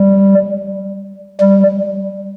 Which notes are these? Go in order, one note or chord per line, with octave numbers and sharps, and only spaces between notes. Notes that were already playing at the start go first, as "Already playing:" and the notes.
Already playing: G3
G3